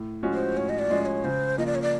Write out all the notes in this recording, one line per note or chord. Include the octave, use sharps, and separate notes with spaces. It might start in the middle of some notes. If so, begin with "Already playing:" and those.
Already playing: A2
F3 G#3 C#4 F#4
C5
A2 C#5
D#5
D5
F3 G#3 C#4 F#4
D5
C#5
C#3 C5
F3 A#3 D#5
D5
C#5
D5